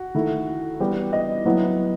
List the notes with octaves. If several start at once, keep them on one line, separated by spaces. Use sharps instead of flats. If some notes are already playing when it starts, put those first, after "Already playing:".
Already playing: F#4
D#3 A3 E4
E3 G3 B3 G4
D#5
A2 F#3 B3 E4